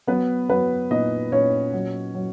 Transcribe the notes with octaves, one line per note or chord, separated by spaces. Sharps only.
F#3 B3 B4
F#3 B3 B4
A#2 D#4 D#5
A#2 C#4 C#5
F#3
F#3